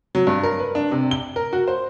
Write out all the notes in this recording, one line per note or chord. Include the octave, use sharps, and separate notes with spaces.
F#3
G2
A#4
B4
D4
C3
G7
A#4
F#4
C5